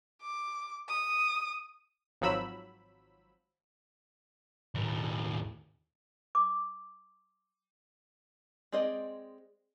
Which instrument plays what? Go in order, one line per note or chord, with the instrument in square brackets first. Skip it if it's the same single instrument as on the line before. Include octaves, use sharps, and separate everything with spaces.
[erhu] D6
D#6
[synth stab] G#1 F3 F#3 B5 E6
[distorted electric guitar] D#2 A2
[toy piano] D6
[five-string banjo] G#3 C4 G#4 D5 D#5